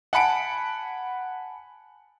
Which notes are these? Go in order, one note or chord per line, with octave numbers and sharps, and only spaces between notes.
F#5 G#5 A5 B5 C#7 D7